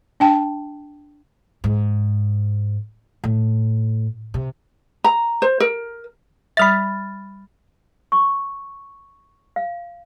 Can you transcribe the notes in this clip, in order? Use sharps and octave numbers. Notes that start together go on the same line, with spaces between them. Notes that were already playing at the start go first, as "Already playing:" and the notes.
D4 G5 A5
G#2
A2
C3
A#5
C5
A#4
G3 E5 B5 F6 A6
C#6
F5